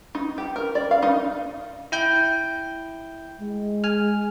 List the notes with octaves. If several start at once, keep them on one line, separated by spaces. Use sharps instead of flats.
D#4
G4
A#4
D5
F5
D#4
E4 G5 G6
G#3
G#5 F6